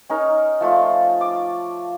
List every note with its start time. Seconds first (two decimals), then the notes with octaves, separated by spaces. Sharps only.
0.09 C#4 D#4 A#4
0.61 F3 A3 F4
1.21 D6